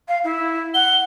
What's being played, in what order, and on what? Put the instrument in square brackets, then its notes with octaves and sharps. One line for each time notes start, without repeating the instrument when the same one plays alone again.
[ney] F5
E4
[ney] F#5 [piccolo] G7